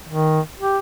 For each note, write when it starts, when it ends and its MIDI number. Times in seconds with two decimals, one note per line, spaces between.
0.08 0.40 51
0.60 0.79 67